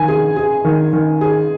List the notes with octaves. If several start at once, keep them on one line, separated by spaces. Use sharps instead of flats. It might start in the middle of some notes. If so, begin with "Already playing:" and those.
Already playing: D#3 G#5
G#4
G#4
D#3
D#3
G#4